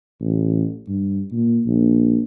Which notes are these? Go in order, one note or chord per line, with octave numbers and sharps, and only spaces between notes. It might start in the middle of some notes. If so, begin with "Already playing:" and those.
A1
G2
A#2
A#1